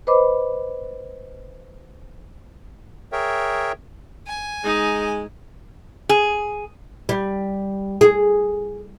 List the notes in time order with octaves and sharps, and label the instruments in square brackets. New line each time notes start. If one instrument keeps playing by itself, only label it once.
[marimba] B4 C5 D#5 B5 D6
[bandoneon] G#4 A#4 C#5 E5 G5
[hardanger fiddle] G#5
[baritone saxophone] G#3 [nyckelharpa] D#4
[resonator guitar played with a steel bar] G#4
[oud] G3
G#4